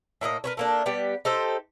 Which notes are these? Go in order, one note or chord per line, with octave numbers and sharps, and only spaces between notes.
A2 A#3 D#4 D#5
A#4 B4 C#5
A3 A#3 D4
G3 B3 G4
D#4 G4 A4 C5